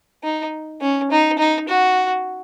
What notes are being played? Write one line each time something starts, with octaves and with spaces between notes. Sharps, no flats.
D#4
C#4
D#4
D#4
F#4